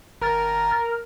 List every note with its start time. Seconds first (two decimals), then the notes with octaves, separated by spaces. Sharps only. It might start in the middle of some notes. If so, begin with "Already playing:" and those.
0.22 G#1 A#4 F6 A6